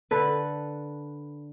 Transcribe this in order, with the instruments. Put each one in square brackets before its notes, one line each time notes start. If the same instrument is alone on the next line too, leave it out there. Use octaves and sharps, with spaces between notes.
[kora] D3 A4 B4